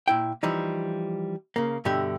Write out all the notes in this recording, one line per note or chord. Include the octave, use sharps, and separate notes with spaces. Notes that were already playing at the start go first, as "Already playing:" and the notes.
A#2 E4 G5
E3 F3 G3 D#4
C#3 A#3
G2 B2 D3 G4 E5